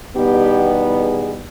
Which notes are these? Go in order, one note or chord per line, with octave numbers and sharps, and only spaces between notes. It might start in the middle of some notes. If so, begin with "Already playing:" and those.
E2 B2 G3 B3 D#4 G4
G#4